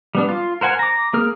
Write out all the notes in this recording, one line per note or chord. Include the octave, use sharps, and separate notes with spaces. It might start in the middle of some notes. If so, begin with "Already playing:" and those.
G3 B3 D4
F4
A#4 C5 F#5 G#5
A#5 D6
A#3 G#4 A#4 F6